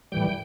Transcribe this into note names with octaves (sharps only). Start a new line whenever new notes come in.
A2 E3 G3 G5